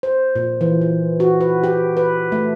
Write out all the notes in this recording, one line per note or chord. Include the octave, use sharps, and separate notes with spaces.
C5
A#2
E3
E3
F#4
B4
G4
B4
A3